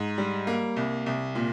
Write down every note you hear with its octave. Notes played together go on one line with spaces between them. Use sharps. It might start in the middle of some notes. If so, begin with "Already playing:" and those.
Already playing: G#2 A#5
G3
A#3
C2
C2
A#2